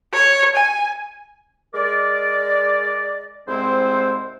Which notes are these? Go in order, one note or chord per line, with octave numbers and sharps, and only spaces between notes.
C#5
G#5
G#3 A#4 D5
C2 G#2 G#3 C4 E4 C5